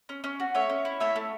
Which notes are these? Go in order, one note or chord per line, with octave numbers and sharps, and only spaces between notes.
C#4
C#4
F#4
A3 C#5 E5
C#4
E4
A3 C#5 E5
A3